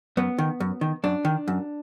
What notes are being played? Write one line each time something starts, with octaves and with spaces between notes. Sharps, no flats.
F#2 B3
D#3
F#2
D#3
F#2 D4
D#3
F#2